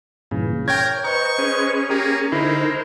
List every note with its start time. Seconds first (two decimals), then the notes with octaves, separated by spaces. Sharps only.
0.31 G2 A#2 C#3 E3
0.68 A#4 C#5 G5 G6 G#6
1.04 B4 C5 D#5 A#5 C#6 G6
1.38 C#4 G#4
1.90 A#3 G4 A#4 A#5
2.32 D3 G#3 D#4 E4 A#4 C5